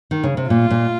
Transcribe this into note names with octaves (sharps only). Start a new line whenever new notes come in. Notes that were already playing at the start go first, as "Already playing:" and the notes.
D#3
C#3
C3
A#2 F4
A#2